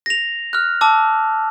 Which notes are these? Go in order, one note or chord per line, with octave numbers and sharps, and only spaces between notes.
A#6 F7
F6 F#6
A5 D6 E6